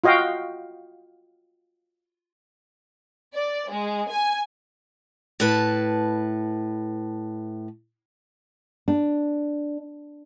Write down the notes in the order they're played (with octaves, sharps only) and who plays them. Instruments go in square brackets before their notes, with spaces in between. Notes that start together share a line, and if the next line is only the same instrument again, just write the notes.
[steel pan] F4 F#4 D#5 F5 G5
[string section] D5
G#3
G#5
[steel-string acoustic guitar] A2 B4 A5
[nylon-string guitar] D4